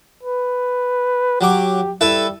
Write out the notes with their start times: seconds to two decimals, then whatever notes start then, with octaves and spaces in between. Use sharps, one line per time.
0.23 B4
1.41 F#3 G4 D6
2.01 G3 E4 A4 B4